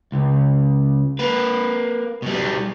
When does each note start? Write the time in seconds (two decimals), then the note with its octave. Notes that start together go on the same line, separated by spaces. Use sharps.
0.12 C#2
1.19 A#3 B4
2.22 B2 G3